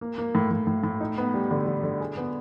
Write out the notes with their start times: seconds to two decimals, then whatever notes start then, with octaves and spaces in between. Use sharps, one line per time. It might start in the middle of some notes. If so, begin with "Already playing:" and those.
0.01 A#3
0.18 A#3
0.35 A2
0.51 A2
0.67 A2
0.84 A2
1.01 D#4
1.18 B3
1.34 G3
1.51 D3
1.67 D3
1.83 D3
2.01 G#4
2.17 B3